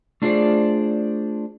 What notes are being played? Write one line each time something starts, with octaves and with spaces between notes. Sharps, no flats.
A3 D4 F4 G#4 C5 D5